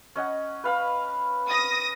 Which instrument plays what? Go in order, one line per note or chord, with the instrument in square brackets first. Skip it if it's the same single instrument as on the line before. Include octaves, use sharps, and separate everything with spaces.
[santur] C#4 D#5 F#5
B4 F5 B5
[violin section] D#6 A#6